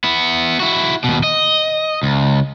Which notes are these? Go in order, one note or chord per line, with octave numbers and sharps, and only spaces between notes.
B3 E4
E4 F#4
D#2 B2
D#5
C#2